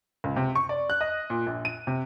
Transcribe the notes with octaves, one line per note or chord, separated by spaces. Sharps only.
C#2
C3
C#6
D5
F#6
D#5
A#2
A#1
D#7
C3